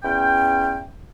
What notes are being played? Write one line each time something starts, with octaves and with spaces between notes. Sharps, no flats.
E2 C#4 G5